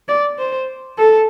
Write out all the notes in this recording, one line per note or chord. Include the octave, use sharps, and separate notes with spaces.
D5
C5
A4